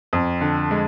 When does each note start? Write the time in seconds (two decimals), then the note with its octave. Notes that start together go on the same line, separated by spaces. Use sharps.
0.13 F2
0.41 D3
0.71 G#3